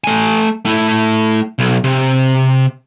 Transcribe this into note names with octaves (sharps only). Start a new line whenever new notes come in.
A3 G#5
A3 E4
B1
C3